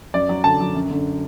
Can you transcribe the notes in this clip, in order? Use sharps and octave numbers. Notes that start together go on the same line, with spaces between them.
F#2 D5
F#3
D3 A5
F#3
F#2
D3